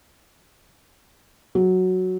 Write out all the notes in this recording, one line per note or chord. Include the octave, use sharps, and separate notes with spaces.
F#3